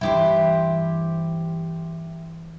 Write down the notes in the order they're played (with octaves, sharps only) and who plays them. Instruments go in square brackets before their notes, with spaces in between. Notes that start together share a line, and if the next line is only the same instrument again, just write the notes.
[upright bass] G2 E3 [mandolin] E4 G4 C5